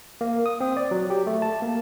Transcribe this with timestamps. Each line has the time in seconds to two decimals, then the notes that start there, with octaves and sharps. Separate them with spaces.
0.21 A#3
0.46 D#6
0.60 C4
0.77 D5
0.91 F#3
1.10 G4
1.27 A3
1.42 A5
1.62 A#3